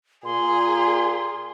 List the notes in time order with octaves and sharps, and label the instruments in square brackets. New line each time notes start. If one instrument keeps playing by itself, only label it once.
[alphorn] A#2 [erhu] G#4 [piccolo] C6